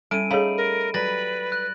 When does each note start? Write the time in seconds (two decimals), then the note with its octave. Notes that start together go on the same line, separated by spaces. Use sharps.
0.11 G3 C#4 E4 A4 D7 D#7
0.31 A3 D#4 G#4 C#5 F5 B5
0.57 A#4
0.94 F#3 G3 B4 A6 A#6 F#7
1.52 F#6